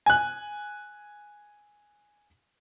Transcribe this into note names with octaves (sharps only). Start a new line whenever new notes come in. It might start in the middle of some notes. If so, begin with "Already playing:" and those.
G#5 F#6